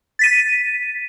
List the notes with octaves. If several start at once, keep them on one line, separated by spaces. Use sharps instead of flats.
A6 B6 D#7